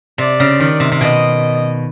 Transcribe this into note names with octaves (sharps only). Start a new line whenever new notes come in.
C3 D5
C#3
D#3
C3
C3
B2 D#5